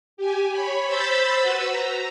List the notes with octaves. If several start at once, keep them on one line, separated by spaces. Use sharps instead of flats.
G4 G#5
C#5 B5
C5 B5 E6 G6 A6 B6
F#4 B4 E6
A#5